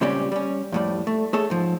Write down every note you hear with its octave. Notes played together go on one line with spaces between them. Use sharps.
C#2 A#2 G3 C4 C#4 G4
G3 C#4
F2 A2 G3
A3
A3 G#4 A4 C#5
G#2 F3